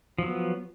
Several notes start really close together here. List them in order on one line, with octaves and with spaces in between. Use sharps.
F3 F#3 B3